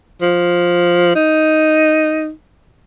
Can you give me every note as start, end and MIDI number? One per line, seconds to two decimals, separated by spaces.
0.22 1.15 53
1.16 2.30 63